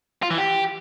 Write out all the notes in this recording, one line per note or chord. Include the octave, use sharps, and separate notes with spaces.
F4
E3
G4